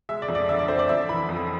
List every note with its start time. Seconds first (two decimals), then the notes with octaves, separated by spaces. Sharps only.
0.09 G#3 E5
0.22 D5
0.28 F2
0.35 D5
0.49 D3 E5
0.59 D5
0.68 F2 C5
0.79 D5
0.89 F2 E5
1.09 E3 B5
1.29 F2